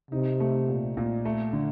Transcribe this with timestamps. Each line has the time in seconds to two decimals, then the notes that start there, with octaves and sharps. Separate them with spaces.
0.11 C3 D#4
0.40 A3
0.69 A#2
0.97 A#2
1.25 A3
1.53 D3